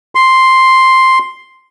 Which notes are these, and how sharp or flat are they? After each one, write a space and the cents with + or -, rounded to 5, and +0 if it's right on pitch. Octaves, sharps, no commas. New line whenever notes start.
C6 +0